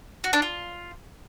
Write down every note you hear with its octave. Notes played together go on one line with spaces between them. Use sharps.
F#4
D4
F4